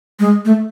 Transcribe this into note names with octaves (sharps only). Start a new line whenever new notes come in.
G#3
A3